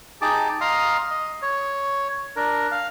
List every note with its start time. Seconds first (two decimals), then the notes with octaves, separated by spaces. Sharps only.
0.22 D#4 G4 G#4 A5 D6
0.61 D#5 F5 A#5 C6 D#6
1.11 D#5
1.42 C#5
2.36 D4 A#4
2.72 F5